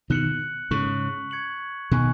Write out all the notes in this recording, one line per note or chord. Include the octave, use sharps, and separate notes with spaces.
B2 D#3 F#6 C#7 F#7
G#2 C#3 C#6 B6 F#7
C#6 G#6 C#7 F#7
B2 D#3 G#5 C#6 F#6